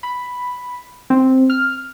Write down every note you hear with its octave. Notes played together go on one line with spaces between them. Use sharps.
B5
C4
F6